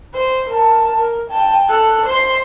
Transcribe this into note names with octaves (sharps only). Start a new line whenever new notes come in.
C5
A#4 A5
A#4
G5 A5
A4 F#6
C5 C6